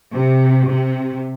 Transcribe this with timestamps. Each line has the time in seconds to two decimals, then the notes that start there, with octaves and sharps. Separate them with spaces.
0.12 C3
0.67 C3